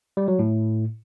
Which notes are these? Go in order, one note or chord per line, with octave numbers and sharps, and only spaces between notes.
G3
F#3
A2